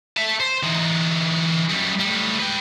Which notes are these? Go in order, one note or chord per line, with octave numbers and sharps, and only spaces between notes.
E5 A5
C5
E3 D#4
F#2 G3
A2 G3
B4 G5